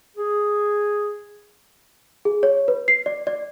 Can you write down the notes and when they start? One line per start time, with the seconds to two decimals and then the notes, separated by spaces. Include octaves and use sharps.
0.17 G#4
2.25 G#4
2.43 C#5
2.68 B4
2.88 C7
3.06 D5
3.27 D5